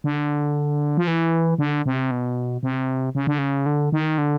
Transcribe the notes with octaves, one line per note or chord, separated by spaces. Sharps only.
D3
F3
E3
D3
C3
B2
C3
C#3
D3
C#3
D3
D#3
D3